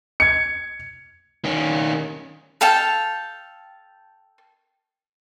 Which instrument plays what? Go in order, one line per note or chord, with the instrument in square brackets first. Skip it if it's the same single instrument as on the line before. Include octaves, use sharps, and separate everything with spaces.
[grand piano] G#6 C#7
[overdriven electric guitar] D#3 C#4
[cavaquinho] A4 F5 G5 A5